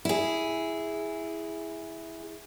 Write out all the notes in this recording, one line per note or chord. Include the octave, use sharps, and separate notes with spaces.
E4 G#4